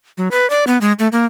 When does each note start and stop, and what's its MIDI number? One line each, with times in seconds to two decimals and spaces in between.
0.18 0.28 54
0.31 0.48 71
0.50 0.64 74
0.67 0.78 59
0.81 0.92 56
0.99 1.08 57
1.12 1.25 58